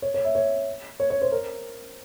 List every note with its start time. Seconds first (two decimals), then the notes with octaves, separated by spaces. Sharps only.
0.02 C#5
0.14 C#5
0.25 E5
0.35 C#5
1.00 C#5
1.10 C#5
1.22 C5
1.32 A#4